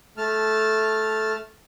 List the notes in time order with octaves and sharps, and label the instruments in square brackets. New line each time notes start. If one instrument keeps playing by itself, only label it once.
[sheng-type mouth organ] A3 A5 F6